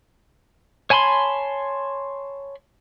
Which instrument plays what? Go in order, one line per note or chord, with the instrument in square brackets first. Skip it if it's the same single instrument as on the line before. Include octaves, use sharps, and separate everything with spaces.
[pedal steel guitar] C#5 G#5 A5 B5 C6